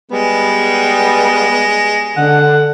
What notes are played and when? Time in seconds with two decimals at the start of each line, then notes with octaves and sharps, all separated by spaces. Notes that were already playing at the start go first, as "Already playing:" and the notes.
0.12 G3 G#3 B3
2.17 D3 F#5